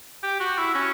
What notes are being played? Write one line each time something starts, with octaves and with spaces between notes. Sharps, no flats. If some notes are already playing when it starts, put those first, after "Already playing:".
G4
F#4
E4
C#4